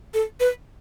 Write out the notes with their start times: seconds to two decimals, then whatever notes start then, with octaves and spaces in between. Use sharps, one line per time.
0.14 A4
0.40 B4